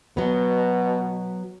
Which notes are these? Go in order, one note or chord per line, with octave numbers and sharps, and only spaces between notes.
B2 F#3 B3